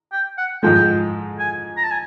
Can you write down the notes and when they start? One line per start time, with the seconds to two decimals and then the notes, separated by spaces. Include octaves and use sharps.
0.12 G5
0.38 F#5
0.63 G#2 F3 G#3 G5
1.39 G#5
1.77 A#5
1.84 A5
1.91 G#5